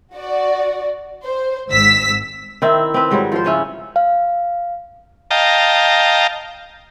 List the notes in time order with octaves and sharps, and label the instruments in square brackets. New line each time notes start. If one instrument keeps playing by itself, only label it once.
[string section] F#4 D5
C5
G#1 G#2 E6 B6
[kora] D#3 C4 E4
C4 B4
G#2 G3 F#4 C#5
F3 F4 C5
C#3 C#4 E4
[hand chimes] F5
[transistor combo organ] D#5 F5 G5 A5 A#5